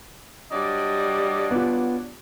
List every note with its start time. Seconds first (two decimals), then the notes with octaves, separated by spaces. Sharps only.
0.52 F#3 G3 D4 D5 D#5
1.51 B3 F4